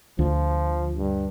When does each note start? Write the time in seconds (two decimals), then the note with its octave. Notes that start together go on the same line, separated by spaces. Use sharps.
0.19 D2 F3
0.97 G2